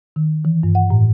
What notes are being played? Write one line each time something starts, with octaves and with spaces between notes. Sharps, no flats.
D#3
E3
G2
F#5
A2